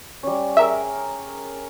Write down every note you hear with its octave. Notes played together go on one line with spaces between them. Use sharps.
G3 C#4
G#4 A#4 E5